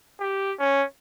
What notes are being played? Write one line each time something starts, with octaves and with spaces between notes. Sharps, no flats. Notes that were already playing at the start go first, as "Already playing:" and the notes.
G4
C#4